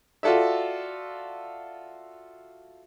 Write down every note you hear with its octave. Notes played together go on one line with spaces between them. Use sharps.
F4 F#4 A4 D5 E5